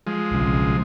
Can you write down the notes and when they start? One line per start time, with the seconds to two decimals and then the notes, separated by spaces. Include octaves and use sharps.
0.07 F3 G#3
0.32 B1 C#3